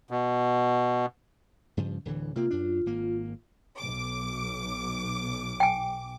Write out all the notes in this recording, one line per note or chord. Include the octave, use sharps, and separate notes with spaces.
B2
G2 C#3 F3
D1 D3 E3
C3 A#3 C4 F4
F#2 D4
G#1 A#3
B1 D6
G5 G#5